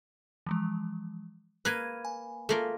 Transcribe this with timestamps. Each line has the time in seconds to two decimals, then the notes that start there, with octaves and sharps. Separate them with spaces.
0.47 E3 F3 G#3
1.65 A#3 B4 F6 G#6 D#7
2.05 G#5
2.49 A3 A#3 F4